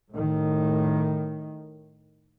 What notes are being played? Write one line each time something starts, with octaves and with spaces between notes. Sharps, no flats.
A2 D#3